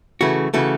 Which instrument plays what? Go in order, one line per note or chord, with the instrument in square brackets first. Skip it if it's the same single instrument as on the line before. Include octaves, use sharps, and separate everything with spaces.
[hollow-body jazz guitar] C#3 E3 A3 F#4
C#3 E3 A3 F#4